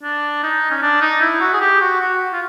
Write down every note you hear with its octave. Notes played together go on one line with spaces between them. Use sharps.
D4
D#4
C#4
D4
D#4
E4
F#4
G#4
G4
F#4
F#4
F4